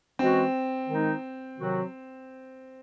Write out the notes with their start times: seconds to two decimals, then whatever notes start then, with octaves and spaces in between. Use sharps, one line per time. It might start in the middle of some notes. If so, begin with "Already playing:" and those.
0.19 E3 G#3 C4 C#4 F#4
0.88 D#3 G#3 D#4
1.57 C3 D#3 F#3 C4 F#4